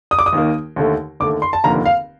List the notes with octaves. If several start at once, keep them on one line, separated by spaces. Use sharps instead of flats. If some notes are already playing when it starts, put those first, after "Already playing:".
D#6
D6
D#6
D#2 D#3 A#3
D#2 D3 A3
D#2 D3 A3 D6
C6
A5
F1 D#2 D3 F3 A#3 A#5
F5